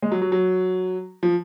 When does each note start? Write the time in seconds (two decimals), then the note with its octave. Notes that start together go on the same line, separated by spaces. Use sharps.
0.02 G#3
0.12 F#3
0.22 F#3
0.32 F#3
1.23 F3